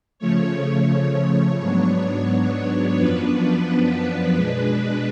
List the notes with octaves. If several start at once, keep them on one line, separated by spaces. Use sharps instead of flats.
C#3 F3 A3 C#5
G#2 F#3 B3 D4 C#5
F#2 F3 B3 D4 B4
B2 G#3 D4